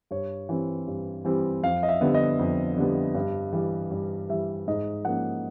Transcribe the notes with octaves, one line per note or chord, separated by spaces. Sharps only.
G2 C#5
E3 G3 C4
G2
E3 G3 C4
F2 F5
D#5
E5
D3 G3 B3
D#5
F2
D3 G3 B3
G2
E3 G3
G2
E3 G3 E5
G#2 D#5
F3 A#3 C#4 F#5